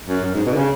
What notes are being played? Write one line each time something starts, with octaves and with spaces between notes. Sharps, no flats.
F#2
F#2
G#2
B2
D3
C#3